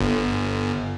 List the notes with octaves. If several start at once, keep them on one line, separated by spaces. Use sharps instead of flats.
G1